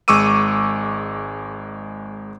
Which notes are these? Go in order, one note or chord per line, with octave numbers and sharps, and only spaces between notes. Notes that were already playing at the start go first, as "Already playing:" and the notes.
G#1 G#3 C#6 D6 E6 D#7